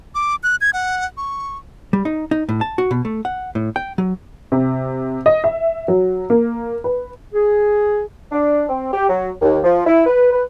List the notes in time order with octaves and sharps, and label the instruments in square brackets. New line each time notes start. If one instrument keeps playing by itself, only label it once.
[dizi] D6
F#6
G#6
F#5
C#6
[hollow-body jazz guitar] G3
D#4
D#4
A2
A5
F#4
B2
A3
F#5
A2
G5
F#3
[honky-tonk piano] C3
D#5
E5
F#3
A#3
B4
[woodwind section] G#4
D4
C4
G4
F#3
D#2
F3
E4
B4
B4